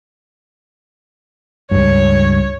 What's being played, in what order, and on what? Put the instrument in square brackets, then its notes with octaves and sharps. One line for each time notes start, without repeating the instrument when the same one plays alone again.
[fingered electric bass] C#2 G2 [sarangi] C#5